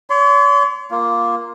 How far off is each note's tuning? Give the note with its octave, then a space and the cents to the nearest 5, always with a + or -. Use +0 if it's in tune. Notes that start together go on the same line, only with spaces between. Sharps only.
C#5 +45 C6 -30
A#3 +5 F4 -5